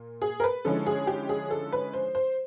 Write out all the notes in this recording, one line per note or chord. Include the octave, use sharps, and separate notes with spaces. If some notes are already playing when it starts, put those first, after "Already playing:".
Already playing: A#2 A#3
G#4
A#4
B4
D3 F3 G#3 C#4 E4 A4
G#4
G4
G#4
A4
B4
C5
C5